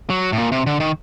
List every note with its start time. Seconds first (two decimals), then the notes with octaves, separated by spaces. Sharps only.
0.10 F#3
0.32 A2
0.38 A#2
0.52 C3
0.66 D3
0.80 D#3